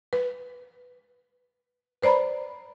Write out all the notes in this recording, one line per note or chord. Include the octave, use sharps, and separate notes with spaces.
B4
B4 C5 D5 A#5 B5